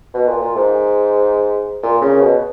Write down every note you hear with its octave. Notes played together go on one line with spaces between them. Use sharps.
B2
A#2
A#2
G#2
A#2
C#3
B2